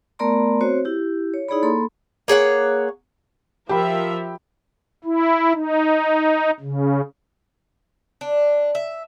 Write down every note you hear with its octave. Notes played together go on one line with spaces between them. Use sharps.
A3 B3 A#4 D5 A#5 C6
C4 F#4 C5 C#5
E4 G4
C#5
D#4 E4 G#4 C#5 D5 B5
A#3 A4 B5 C6
A#3 G#4 C#5 F#5
F3 G4 A#4 E5 B5
E4
D#4
C#3
D4
E5